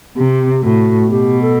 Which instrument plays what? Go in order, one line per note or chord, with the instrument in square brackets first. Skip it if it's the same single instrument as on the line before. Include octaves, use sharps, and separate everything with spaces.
[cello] C3 [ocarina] G4
[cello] A2 [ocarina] F#4
[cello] B2 [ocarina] G4
[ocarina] A4